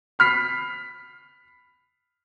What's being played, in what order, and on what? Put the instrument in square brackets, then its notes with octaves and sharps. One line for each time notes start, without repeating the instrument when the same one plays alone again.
[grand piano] B5 F6 B6 C7